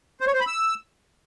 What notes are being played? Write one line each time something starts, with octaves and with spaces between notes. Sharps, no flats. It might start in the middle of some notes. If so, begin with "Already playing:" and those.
C5
C#5
C5
B5
E6